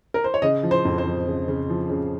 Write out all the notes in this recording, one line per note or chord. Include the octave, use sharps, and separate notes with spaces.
A#4
C5
C#5
C#3 D#5
F3
C5
F2
C5
F3
C#3
C#3
F3
C#3